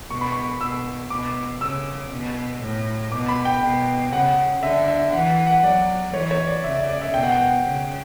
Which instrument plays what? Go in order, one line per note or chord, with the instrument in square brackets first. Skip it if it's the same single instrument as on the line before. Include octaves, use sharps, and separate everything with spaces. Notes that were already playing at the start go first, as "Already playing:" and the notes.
[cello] B2 [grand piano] C#6
[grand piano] B5
C#6
[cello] B2 [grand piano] E6
[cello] B2 [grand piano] D6
[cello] C#3 [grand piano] E6
[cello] B2
A2
[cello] B2 [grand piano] D6
[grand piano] B5
G5
[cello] B2
[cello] C#3 [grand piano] F#5
[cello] D3 [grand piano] E5
[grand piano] E5
[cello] E3 [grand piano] F#5
[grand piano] F#5
[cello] F#3 [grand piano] D5
[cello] E3 [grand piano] C#5
[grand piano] C#5
D5
[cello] C#3 [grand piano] E5
[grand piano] D5
D5
E5
[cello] B2 [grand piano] G5
[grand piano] F#5
G5
[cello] C#3